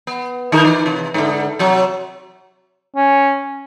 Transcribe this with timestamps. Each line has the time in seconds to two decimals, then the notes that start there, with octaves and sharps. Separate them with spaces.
0.07 B3
0.52 D#3 D#4 A#4
0.65 E3
0.86 C3
1.14 G#2 D3
1.59 C3 F#3
2.96 C#4